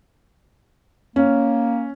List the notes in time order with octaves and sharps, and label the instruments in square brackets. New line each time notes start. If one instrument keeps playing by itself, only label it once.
[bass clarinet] A#3 [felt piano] C#4